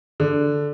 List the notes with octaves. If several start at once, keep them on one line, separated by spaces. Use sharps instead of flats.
D3